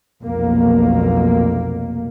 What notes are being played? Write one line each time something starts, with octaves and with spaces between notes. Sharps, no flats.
F1 B1 A#3